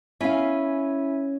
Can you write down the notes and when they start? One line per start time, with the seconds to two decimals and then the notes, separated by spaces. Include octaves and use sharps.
0.21 C#4 E4 E5 F5 G#5